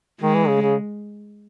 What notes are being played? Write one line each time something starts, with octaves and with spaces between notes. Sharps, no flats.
D#3 G#3
E3
C#3
C#3